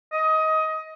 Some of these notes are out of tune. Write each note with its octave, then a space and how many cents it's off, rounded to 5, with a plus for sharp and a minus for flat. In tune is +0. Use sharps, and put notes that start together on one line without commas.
D#5 +20